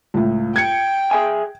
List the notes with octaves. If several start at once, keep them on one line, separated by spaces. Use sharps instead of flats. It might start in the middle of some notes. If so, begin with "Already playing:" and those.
C#2 A2
G5 G#6 C#7
G#4 E5 G#5